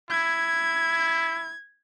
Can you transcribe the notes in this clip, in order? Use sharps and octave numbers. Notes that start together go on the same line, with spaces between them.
E4 G#6